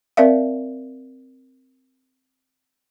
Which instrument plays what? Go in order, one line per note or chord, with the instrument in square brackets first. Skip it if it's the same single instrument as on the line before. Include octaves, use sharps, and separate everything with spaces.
[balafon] C4 A#4 D5 E5 F5